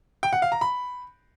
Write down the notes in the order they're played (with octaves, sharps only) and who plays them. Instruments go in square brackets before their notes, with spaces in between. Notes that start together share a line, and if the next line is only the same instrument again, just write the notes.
[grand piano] G5
F#5
F5
A#5
B5